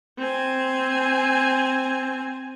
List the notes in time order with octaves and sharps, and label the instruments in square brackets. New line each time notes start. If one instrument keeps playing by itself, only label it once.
[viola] C4 G#5